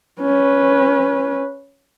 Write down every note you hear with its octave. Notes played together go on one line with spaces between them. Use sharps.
C#4 B4